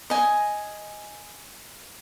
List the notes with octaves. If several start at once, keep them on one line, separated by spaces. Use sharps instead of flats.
D#5 G#5